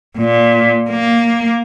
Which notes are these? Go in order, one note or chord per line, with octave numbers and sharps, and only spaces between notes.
A#2
A#3